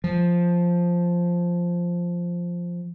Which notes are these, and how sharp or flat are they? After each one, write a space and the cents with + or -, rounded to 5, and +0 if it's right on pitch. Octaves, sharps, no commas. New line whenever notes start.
F3 +0